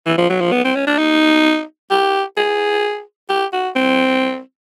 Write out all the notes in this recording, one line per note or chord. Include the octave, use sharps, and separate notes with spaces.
E3
F3
F#3
F3
B3
C4
C#4
D4
D#4
G4
G#4
G4
F#4
C4